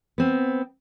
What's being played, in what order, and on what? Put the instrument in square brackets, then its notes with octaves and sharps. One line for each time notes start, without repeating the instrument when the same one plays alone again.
[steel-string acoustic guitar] B3 C4